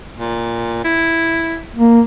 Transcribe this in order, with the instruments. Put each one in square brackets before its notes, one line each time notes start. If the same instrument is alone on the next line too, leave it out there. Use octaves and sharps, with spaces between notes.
[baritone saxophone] A#2
E4
[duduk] A#3